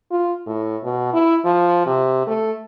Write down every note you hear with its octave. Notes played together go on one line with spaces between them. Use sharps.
F4
A2
B2
E4
F3
C3
A3